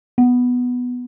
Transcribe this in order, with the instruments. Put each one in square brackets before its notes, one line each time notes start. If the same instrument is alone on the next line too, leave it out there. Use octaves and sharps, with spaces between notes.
[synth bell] B3